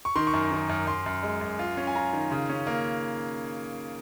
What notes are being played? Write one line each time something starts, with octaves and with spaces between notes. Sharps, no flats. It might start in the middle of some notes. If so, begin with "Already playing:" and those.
C#6
D#3 C6
C#6
F#2
D#3
F#2
F#2 C6
F#2
G#3
F#2
F4
C#4
G#5
F4 A#5
D#3
C#3
C#4
A#3